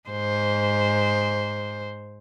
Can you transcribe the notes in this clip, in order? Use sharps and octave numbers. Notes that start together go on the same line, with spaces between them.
G#2 C5